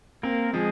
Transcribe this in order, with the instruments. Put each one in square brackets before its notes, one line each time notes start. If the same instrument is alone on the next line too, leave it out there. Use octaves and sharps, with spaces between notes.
[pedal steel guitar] A#3 A#4 [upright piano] C4
[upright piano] F3 [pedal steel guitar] G#3 G#4